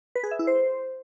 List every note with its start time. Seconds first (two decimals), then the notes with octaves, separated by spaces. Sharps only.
0.15 B4
0.23 G#4
0.31 E5
0.39 E4
0.47 C5